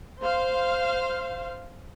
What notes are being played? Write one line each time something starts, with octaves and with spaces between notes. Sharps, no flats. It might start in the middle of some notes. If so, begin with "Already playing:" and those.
C5 F5